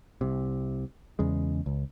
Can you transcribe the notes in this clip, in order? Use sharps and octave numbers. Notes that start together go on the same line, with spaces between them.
C2 C3
E2 C#3 G#3
C#2